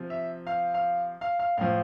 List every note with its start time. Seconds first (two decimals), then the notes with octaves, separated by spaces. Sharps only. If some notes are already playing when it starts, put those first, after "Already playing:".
Already playing: C3 F3
0.10 E5
0.47 F5
0.74 F5
1.21 F5
1.39 F5
1.57 A2 F3 F5